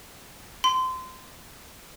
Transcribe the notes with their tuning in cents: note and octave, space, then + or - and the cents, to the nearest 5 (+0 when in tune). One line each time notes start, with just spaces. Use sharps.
C6 -25